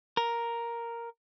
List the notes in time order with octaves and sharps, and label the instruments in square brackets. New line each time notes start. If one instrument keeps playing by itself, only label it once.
[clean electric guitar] A#4